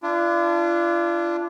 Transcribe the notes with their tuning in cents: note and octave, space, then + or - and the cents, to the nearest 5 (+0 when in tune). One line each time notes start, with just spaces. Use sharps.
D4 +0 F4 -40